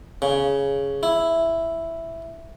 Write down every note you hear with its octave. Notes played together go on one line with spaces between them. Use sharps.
C#3
E4